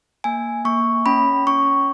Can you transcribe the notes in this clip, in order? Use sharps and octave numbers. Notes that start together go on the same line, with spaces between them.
A#3 G#5
A#3 C#6
C#4 B5
C#4 C#6